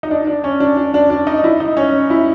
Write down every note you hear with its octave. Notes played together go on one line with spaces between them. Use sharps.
D#4
D4
D4
C#4
D4
D4
D4
D4
D#4
E4
D#4
C#4
E4